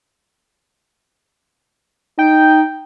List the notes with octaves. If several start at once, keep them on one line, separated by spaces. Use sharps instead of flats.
D#4 G5